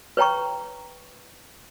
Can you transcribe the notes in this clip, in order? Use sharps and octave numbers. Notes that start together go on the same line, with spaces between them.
B4 C#5 G5 A#5 C#6